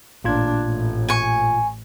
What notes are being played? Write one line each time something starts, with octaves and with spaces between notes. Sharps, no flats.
A1 A#2 D4 F4 G#6
A1 A2
G#5 C#6